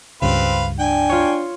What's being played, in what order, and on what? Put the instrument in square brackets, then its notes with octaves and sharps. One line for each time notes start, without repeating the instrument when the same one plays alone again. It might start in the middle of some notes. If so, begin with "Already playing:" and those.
[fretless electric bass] C#2 G2 C#3 [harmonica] C4 B4 F5
[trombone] D4 [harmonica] G5 G#5
[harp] F4 C#5